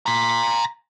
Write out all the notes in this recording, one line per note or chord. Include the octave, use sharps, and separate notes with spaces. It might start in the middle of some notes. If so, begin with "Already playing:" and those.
A#5 C6